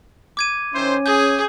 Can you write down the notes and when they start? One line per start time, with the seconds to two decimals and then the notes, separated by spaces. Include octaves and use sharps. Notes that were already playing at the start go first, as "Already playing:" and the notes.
0.37 D6 G#6 D#7
0.74 D#3 C#4 E4 C5
1.06 G#4 G#5 G6